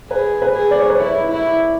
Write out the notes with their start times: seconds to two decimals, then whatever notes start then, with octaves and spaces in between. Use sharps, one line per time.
0.11 G#4 B4
0.42 B4
0.55 G#4
0.71 D5
0.81 C#5
0.90 B4
1.00 E4 C#5
1.30 E4